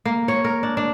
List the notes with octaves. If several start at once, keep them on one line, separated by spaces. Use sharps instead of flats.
A#3
C#5
A#4
D4
D4